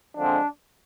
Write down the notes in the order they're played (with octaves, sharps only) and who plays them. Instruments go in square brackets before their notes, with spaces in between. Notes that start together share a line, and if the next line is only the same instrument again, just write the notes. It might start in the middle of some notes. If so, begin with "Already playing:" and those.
[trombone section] D3 F3 G#3 C4 D4